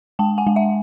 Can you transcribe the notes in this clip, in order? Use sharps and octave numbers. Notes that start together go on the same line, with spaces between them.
G#3 G5 A5
F#5 G#5
G#3
E5 F#5